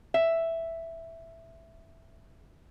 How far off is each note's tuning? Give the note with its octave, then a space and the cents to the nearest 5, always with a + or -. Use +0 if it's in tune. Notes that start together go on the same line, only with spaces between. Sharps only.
E5 +0